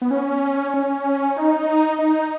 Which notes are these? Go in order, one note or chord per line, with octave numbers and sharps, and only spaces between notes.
B3
C#4
C#4
D#4
D#4